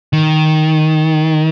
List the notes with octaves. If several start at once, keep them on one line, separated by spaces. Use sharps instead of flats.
D#3